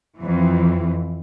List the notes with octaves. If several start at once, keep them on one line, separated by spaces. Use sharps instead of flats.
F2 E3